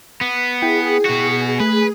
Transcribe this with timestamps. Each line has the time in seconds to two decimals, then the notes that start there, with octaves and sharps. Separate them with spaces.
0.21 B3
0.62 E4 G#4 G5
1.05 B2 F#4
1.60 A3 B4